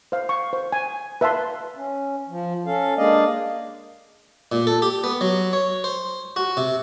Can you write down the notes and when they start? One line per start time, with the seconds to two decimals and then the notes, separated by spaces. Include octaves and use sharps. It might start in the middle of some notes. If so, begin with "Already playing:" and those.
0.12 C5 F5
0.29 C#6
0.53 C5
0.72 G#5
1.21 B4 E5 F5 A5 C6
1.76 C#4
2.29 F3
2.66 C#4 A4 F5
2.97 G#3 A#3 D4 D5 D#5 F5
4.52 A#2
4.67 A4
4.82 G4
5.04 B3
5.21 F#3
5.53 C#5
5.84 C5
6.36 F#4
6.57 C3